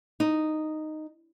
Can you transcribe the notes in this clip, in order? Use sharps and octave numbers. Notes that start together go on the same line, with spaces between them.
D#4